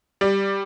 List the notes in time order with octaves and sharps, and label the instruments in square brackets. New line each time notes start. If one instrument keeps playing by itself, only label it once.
[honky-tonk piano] G3